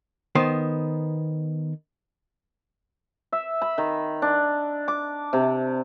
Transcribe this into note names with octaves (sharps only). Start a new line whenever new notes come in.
D#3 B3 C5
E5
B5
D#3
D4
D6
C3